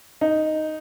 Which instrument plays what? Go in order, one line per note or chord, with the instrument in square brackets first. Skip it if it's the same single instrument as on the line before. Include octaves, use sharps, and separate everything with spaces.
[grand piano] D#4